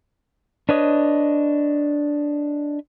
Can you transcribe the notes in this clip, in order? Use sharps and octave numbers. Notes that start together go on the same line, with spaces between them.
D4 B4 C#5 D#5